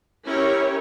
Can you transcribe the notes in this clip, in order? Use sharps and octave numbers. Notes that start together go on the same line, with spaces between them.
C#4 E4 G4 A#4 C#5